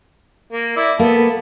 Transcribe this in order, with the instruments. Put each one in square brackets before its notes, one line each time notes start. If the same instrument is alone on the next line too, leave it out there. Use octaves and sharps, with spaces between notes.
[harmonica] A#3
E4 D5
[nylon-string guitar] A#3 [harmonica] B3 A4 A5